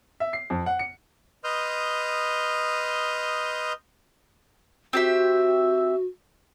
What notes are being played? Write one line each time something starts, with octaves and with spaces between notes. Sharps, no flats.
E5
C7
F2
F#5
C#7
B4 D#5 C6 D#6 F6 G6
C4 F#4 G4 E5